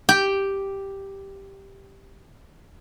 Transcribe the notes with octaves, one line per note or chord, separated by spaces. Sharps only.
G4 G5